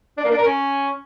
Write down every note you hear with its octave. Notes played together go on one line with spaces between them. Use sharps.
D4
A#3
D4
A#4
C#4